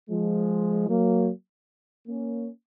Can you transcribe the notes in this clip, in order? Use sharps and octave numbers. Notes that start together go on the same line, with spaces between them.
F3 G#3
F#3 A#3
A#3 C#4